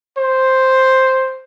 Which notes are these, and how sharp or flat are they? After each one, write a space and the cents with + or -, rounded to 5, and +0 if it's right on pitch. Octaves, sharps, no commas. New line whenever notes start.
C5 +0